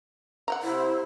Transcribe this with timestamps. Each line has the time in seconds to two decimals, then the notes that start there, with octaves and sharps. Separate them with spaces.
0.48 F#5 G5 A#5
0.63 C3 E4 C5